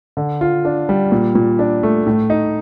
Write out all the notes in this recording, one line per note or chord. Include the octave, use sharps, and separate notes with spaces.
D3
F4
D4
G3
A#2
A#2
D4
A3
A2
D#4